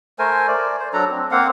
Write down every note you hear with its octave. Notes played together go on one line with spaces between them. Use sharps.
A3 A#4 C5 G#5
D5
C5
F#3 D4 A4 A#5
C4
A#3 C4 F5 F#5